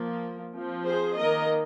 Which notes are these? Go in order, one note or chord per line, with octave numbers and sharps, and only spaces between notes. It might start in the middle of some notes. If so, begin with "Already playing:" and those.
Already playing: F3 A#3
F3 C4
G#4 C5
D#3 A#3 A#4 D#5